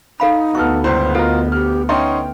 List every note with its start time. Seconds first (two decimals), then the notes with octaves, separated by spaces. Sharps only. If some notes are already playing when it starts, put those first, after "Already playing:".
0.20 D#4 A4 F5 B5
0.55 D2 B3 F#4 A4 C#6 F6
0.84 G1 C#2 E4 C5
1.15 F4 F#4 A4 A#4 D#5
1.52 G4 F6
1.89 C#4 D#4 E5 G5 C6